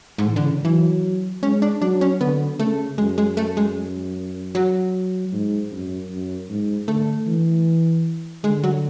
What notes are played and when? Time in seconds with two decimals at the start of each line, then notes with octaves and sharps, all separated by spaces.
0.18 G#2
0.26 A2 E3
0.36 D3
0.45 C#3
0.64 E3 F#3
1.42 G#3 C#4
1.62 D4
1.82 F#3 D4
2.01 C#4
2.20 D3 B3
2.59 C#3 A3
2.98 F#2 G#3
3.18 G#3
3.37 A3
3.57 G#3
4.55 F#3
5.32 G#2
5.71 F#2
6.10 F#2
6.49 G#2
6.88 D3 A3
7.26 E3
8.44 D3 G#3
8.64 F#3